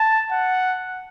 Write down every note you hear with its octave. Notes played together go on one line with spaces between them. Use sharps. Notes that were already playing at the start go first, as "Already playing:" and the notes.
Already playing: A5
F#5